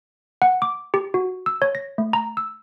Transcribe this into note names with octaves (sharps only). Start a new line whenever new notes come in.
F#5
D6
G4
F#4
E6
C#5
A#6
A3
A#5
E6